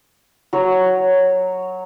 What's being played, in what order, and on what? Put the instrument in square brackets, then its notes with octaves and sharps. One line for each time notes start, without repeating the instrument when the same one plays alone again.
[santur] F#3 C#5